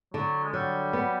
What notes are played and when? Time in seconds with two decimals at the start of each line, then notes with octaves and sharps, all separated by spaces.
0.14 D3 F#3
0.43 G#3
0.53 F#3 G3
0.93 B3